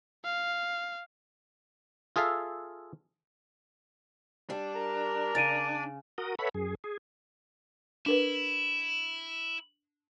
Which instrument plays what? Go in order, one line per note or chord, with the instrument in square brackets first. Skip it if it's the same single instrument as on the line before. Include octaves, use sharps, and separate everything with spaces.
[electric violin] F5
[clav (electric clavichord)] F4 G#4 A4 E5 F5
[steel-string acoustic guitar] G3 [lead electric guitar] D4
[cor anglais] A#4
[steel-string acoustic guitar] C#3 [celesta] A6 D7 D#7
[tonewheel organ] F#4 A#4 D#6
A4 B4 C#5 E5 F#5 B5
F#2 G#4
G#4
[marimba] D4 A#4 B4 [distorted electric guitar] E4